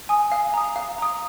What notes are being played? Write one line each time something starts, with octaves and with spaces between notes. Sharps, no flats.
G#5 D#6
F5
A#5 D#6
F5
A#5 D#6